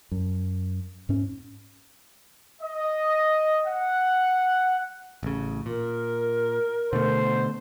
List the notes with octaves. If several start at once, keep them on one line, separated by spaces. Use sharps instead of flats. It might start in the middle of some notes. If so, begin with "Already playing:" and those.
F#2
G#2 C#4
D#5
F#5
A1 C#3
A#2 A#4
B2 D3 A3 C5